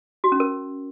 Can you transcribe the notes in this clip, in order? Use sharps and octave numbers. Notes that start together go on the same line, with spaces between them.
F#4
C#4
A#4